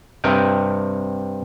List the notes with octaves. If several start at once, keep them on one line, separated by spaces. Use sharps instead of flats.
G2 C3 A#4 D#5 G5